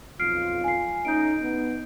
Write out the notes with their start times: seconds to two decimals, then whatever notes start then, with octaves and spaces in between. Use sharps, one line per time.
0.20 B1 F2 F4 F6 C7 D7
0.64 G#5 C7
1.05 A3 C#4 D#4 G6 D7
1.42 B3 D#4